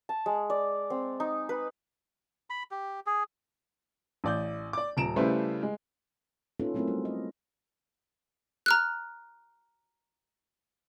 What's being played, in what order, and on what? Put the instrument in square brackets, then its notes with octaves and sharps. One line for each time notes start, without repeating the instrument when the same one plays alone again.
[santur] A5
G#3
D5
C4
D#4
B4
[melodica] B5
G4
G#4
[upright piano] A1 D5 G6
D5 D6
D#1 A#5 D7 E7
C#3 G3 A3 E4 B4 C5
G#3
[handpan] A#3 C#4 D#4 F4 A4 B4
F#3 A3 C4 E4 F#4 A#4
G3 E4 F#4
D#5
[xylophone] A#5 F6 F#6